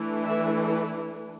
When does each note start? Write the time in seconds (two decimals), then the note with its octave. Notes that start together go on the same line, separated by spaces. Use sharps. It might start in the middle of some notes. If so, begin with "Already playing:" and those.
Already playing: E3 A3 D4
0.25 E5
0.71 B4